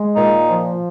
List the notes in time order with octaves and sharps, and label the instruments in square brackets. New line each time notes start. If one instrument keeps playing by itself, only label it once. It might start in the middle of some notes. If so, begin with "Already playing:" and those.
Already playing: [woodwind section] G#3
[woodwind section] A#2 [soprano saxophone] D#4
[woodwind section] F3